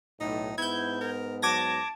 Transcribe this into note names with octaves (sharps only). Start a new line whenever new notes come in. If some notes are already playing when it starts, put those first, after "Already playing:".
B1 A2 D#4
G#2 B3 E4 G6 G#6
A#4
F#3 A5 D6 G#6 A#6